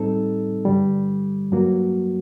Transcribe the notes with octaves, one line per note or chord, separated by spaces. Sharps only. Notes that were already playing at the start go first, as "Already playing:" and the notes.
Already playing: A2 G3 C4 D#4 A4
G2 D3 G3
G2 F#3 A#3 F#4